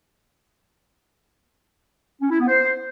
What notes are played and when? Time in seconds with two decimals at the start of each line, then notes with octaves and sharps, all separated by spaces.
2.21 C#4
2.30 E4
2.39 B3
2.48 C5